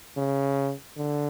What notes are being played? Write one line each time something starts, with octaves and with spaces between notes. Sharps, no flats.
C#3
D3